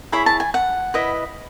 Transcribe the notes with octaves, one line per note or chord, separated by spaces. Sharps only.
E4 G#4 C#5 B5
A5
G#5
F#5
E4 B4 D#5